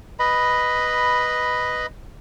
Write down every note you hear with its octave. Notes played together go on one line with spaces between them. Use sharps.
B4 D#5 B5